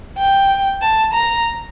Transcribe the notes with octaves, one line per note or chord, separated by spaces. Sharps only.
G5
A5
A#5